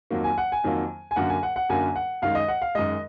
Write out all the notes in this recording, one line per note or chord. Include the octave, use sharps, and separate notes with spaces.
F2 D#3 F#3 A#3
G#5
F#5
G#5
F2 D#3 F#3 A#3
G#5
F#2 D3 F#3 A#3 F#5
G#5
F#5
F#5
F#2 D3 F#3 A#3 G#5
F#5
F#2 D#3 G#3 F5
D#5
F#5
F5
F#2 D#3 G#3 D#5